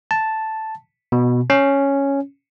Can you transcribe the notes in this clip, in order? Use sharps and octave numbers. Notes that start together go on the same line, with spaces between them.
A5
B2
C#4